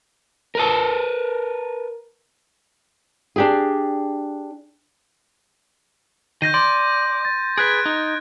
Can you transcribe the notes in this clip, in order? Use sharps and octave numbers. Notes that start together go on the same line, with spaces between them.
A#4 B4 A5
D4 G4 G#4
D#3 G6 A#6 D#7
D5 C6
A6
G#4 B4 F#6 G#6 D7
D#4